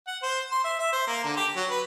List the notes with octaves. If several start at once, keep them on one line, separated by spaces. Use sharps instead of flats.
F#5
C5
C6
E5
E5
C5
A#3
D3
G4
F#3
B4